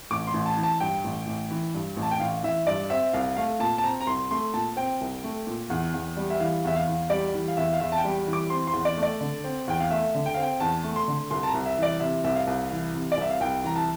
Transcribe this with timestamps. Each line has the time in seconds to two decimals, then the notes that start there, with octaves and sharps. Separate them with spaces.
0.10 A1 D6
0.27 C6
0.34 A1
0.46 A5
0.57 E3
0.63 A5
0.80 G2 G5
1.04 A1
1.27 A1
1.51 E3
1.74 G2
1.96 A1
2.02 A5
2.11 G5
2.20 A1 F5
2.43 E3 E5
2.67 G2 D5
2.90 C4 E5
3.13 C2 F5
3.36 A3 F5
3.60 A#2 A5
3.78 A5
3.84 C4 A#5
4.01 A#5
4.07 C2 C6
4.31 A3 C6
4.54 A#2 A5
4.77 C4 G5
5.01 C2
5.24 A3
5.47 A#2
5.70 E2
5.94 E2
6.17 G3
6.30 E5
6.40 E3 F5
6.64 E2 E5
6.76 F5
6.87 E2
7.10 G3 D5
7.34 E3
7.48 F5
7.57 E2 E5
7.73 F5
7.80 E2 E5
7.92 A5
7.98 G5
8.04 G3
8.27 E3
8.33 D6
8.50 C4 C6
8.67 C6
8.73 E2
8.85 D5
8.97 A3
9.03 D5
9.21 D3
9.44 C4
9.68 E2 G5
9.80 F5
9.90 A3 E5
10.14 D3
10.26 G5
10.34 C4 F5
10.42 G5
10.60 E2 A5
10.84 A3
10.96 C6
11.08 D3
11.31 C2 C6
11.43 A5
11.48 A#5
11.54 C2
11.66 E5
11.78 E3 D5
12.00 C3 E5
12.24 C2 E5
12.36 F5
12.47 C2
12.71 E3
12.94 C3
13.12 D5
13.17 C2 E5
13.31 F5
13.40 C2 G5
13.64 E3 A#5
13.76 A5